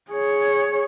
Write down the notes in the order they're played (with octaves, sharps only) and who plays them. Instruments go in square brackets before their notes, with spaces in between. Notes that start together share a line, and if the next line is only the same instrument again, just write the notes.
[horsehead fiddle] G#4 C#5